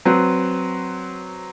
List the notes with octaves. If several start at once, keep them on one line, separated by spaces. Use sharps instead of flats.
F#3 C4 B4